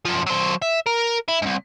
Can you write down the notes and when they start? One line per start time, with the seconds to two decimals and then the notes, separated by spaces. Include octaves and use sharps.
0.05 F#2 F3
0.26 F#3 C5
0.62 E5
0.86 A#4
1.29 E4
1.42 C2 G#2